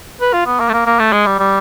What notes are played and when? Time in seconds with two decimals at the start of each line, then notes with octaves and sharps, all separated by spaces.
0.21 B4
0.33 F4
0.46 B3
0.60 A#3
0.69 A3
0.73 A#3
0.86 A#3
0.99 A3
1.12 G#3
1.27 G3
1.39 G3